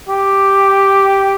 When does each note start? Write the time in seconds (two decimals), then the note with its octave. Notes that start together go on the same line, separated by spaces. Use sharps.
0.09 G4